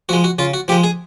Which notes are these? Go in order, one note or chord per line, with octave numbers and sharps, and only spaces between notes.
F3 G#3 F#4
F#4
C#3 F4
F#4
F3 G#3 G4
G#4